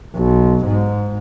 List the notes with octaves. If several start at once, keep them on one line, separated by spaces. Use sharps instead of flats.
B1
G#2